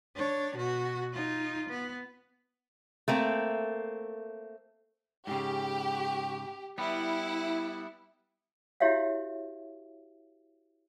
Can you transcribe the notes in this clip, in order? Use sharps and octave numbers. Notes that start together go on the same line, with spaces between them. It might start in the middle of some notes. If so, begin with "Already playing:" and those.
D4 C#5
B2 F#4
D#4 F4
B3
A3 A#3 C4
G#2 C#3 G4
G3 B3 E4
E4 F#4 G4 C#5 E5 F5